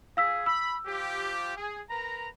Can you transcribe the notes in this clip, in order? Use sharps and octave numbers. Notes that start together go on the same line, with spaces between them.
F4 G#4 F5 E6 B6
B5 E6
F3 F4 G4
G#4
A#4 B4 A#5